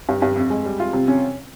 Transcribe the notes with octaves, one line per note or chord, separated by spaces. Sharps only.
G2
G2
F2
G#3
G3
F4
C3
C#4